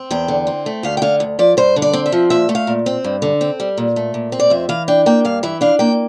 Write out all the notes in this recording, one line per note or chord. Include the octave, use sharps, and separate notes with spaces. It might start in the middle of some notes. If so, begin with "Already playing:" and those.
Already playing: C4
E2 G5
D3
C4
A3
D2 F5
G5
D3 F5
D2
F3 D5
G2 C5
D3
D5
C4
E5
F3
A#2 E5
A3
F5
A#2
C4
G2
D3
C4
G3
A#2
A3
A#2
C4
D5
F2 E5
E3 F5
D4 G5
A#3 G5
G2 F5
E3 E5
D4 F5
A#3 G5